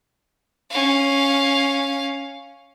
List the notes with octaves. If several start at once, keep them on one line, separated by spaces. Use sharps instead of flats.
C#4 F5